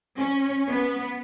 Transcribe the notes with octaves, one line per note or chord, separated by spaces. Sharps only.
C#4
B3